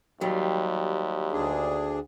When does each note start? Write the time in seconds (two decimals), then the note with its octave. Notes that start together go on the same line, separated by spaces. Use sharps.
0.21 D#2 F#3 G3
1.32 D2 D4 G#4